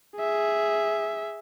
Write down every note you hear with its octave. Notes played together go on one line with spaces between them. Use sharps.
G#4 E5